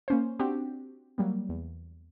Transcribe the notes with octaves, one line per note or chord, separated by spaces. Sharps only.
A#3 C#4 C5
C4 D4 F#4 G4
F#3 G3 A#3
E2